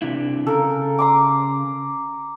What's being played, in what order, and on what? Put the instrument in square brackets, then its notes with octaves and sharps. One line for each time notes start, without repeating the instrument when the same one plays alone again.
[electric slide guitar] C3 D4 E4
[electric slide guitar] C#3 [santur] A4 A#4
[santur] A#5 C6 D6